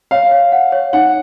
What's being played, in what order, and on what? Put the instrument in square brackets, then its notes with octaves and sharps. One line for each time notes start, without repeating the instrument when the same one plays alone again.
[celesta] C#5 [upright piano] F5
[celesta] C#5
F#5
C#5
[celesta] D#4 [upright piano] F#5